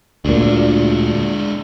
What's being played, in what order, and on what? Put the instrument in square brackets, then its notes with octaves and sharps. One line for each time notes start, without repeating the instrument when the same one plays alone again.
[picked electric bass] D2 A#2 [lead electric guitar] G#3 D4